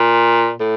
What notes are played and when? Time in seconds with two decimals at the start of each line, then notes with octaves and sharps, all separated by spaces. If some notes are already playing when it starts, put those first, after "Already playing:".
Already playing: A#2
0.60 A2